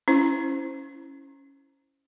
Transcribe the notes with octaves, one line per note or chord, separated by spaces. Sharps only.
C#4 E4 C5